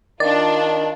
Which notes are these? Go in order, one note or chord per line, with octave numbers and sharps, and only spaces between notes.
D#3 D4 F4 D5